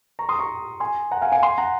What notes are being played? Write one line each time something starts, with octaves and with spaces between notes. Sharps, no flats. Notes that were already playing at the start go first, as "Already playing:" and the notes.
A#5 C#6
C6 D#6
A#5 C#6
G#5 C6
F#5 A#5
F5 G#5
F5 G#5
G#5 C6
F#5 A#5